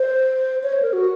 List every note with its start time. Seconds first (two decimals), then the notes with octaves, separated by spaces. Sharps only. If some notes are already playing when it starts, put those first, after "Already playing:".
Already playing: C5
0.63 C#5
0.73 C5
0.82 A#4
0.93 F#4